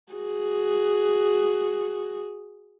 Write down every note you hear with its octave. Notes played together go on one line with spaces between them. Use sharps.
F#4 G#4